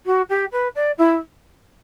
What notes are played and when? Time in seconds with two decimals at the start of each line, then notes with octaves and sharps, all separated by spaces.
0.06 F#4
0.29 G4
0.52 B4
0.75 D5
0.98 E4